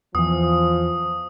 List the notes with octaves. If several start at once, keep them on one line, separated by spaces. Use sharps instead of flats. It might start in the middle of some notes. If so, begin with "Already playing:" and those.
E2 E3 F3 D#6